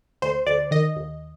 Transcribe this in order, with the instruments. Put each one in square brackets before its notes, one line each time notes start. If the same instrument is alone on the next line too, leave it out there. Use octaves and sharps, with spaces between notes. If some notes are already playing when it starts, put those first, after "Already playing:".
[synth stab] D2 C5
D2 D5
D#3 D#5
D#2